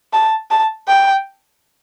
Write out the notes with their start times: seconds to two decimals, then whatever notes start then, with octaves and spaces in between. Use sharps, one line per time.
0.13 A5
0.51 A5
0.88 G5